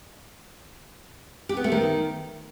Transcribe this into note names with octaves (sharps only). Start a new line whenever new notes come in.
G4
B3
A3
D#3